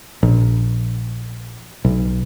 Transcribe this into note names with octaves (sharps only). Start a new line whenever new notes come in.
A#1
B1